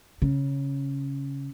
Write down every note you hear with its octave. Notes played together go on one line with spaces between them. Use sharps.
C#3